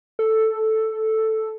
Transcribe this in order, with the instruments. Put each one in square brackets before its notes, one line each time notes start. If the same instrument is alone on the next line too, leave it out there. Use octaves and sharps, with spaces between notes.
[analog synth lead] A4